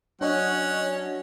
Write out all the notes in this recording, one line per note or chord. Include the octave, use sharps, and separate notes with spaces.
F#3 C#4 D4 C#5 D#5 F#5